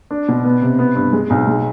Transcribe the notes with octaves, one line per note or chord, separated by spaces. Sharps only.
D4
B2
B3
C3
B3
G2
G#3
B1
G#3